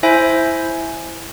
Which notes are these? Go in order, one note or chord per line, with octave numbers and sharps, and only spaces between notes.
E4 C5 E5 G#5